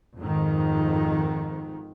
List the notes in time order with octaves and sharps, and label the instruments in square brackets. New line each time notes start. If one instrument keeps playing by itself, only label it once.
[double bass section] F2 G#2 D#3